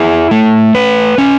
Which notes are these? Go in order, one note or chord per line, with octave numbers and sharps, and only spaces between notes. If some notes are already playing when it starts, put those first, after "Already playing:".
Already playing: E4 G#4
A3
B4
C#4